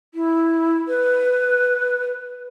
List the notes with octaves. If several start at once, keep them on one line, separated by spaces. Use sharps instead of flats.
E4
B4